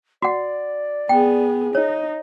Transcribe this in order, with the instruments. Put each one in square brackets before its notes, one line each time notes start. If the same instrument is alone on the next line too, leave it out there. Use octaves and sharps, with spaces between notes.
[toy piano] F#4 F#5 [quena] D5
[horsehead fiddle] B3 G#4 [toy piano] G5
[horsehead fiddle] D#4 [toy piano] C#5 [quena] D#5